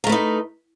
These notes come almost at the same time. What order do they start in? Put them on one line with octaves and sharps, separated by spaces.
A#4 A3 B4 D#4